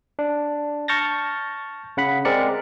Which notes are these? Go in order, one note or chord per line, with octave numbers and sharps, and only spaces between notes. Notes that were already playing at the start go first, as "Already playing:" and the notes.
D4
A5 C#6 F6 G6 A6 A#6
C#3 F#5 B5
G#3 C4 A#4 D5 C#7